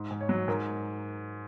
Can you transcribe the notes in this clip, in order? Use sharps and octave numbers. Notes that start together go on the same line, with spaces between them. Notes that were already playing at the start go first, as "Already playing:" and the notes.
Already playing: G#2
G#2
C#5
F#3
G#2 A#4